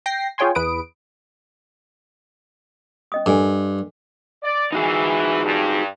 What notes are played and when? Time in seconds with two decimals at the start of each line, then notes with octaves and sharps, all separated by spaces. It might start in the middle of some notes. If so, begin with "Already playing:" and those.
0.06 G5 A#6 C7
0.38 F4 G#4 C#5 G5 G#5 C6
0.55 E2 B4 D#6 D7
3.12 C#4 D#5 D#6
3.26 G2 A4 A#4 G#5
4.43 D5
4.72 E3 D#4 F#4 G#4
5.44 G2